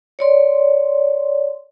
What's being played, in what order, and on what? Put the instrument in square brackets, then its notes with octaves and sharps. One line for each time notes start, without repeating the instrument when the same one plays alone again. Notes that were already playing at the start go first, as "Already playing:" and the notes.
[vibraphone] C#5 D5 C6